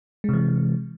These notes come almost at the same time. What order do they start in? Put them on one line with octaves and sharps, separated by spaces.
G#3 C3 E3